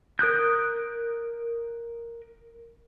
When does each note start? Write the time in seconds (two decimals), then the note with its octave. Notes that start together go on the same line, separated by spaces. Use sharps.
0.19 A#4 D#6 F#6 G6